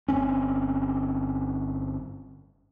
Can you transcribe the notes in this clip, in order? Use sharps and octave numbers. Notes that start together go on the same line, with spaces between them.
G1 C4 C#4